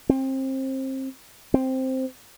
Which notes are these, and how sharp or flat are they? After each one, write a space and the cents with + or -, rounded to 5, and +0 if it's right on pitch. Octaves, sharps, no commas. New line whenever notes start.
C4 +25
C4 +0